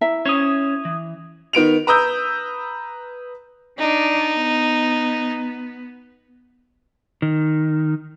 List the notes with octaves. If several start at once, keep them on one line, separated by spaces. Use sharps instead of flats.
E4 E5 A#5
C#4 C5 C#5 D#6 G#6
E3
D#3 B3 D7 F7
B4 A#5 D#6 E6 G6
D4 D#4 D5
B3
D#3